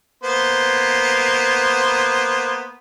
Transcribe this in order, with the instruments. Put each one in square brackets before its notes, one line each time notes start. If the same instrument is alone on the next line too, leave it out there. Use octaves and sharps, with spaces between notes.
[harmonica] A#3 B3 C5